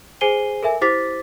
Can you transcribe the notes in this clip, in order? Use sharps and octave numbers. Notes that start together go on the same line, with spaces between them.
G#4 C5 G#5 C7 D#7 G7
A4 A#4 E5 G#5
E4 G4 C5 D6 A6 B6